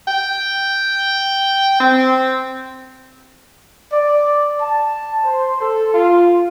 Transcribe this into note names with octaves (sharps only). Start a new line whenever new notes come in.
G5
C4
D5
A5
C5
A4
F4